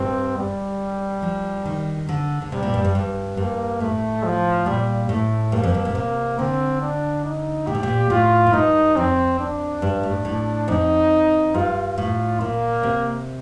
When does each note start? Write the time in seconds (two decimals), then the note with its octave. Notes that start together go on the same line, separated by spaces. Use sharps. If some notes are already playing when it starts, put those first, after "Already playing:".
Already playing: G2 C4
0.37 G3
1.22 F3
1.65 D#3
2.09 D3
2.42 D3
2.52 C3 G3
2.63 A#2
2.74 G2
2.84 G2
2.95 G2
3.37 G2 A#3
3.80 A2 A3
4.24 F3
4.66 A#2 G3
5.09 A2 A3
5.52 G2 A#3
5.63 F2
5.74 G2
5.85 A#2
5.95 C3 A#3
6.39 D3 C4
6.82 D4
7.24 D#4
7.67 A#2 G4
7.75 A2
7.83 A#2
8.10 A2 F4
8.47 A2
8.53 G2 D#4
8.96 F2 C4
9.40 D4
9.82 G2
10.03 A2
10.25 A2
10.68 F2 D#4
11.54 G2 F4
11.98 A2
12.41 A#2 A#3
12.83 C3